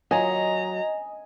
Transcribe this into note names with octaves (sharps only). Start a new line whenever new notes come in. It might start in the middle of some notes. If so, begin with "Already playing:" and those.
F#3 D#5 G#5 A#5